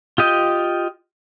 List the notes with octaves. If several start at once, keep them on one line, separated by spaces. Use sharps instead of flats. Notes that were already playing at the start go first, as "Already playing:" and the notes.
F4 G4 D#5 G5